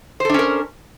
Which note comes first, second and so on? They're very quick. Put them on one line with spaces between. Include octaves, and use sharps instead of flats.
C5 A4 D4 C#4 A#4